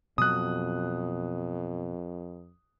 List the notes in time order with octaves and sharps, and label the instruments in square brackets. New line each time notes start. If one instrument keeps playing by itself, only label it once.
[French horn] F2 [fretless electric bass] B2 F#3 [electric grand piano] D#6 F#6